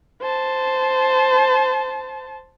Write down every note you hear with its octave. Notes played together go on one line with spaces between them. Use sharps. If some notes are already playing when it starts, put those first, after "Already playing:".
C5 A5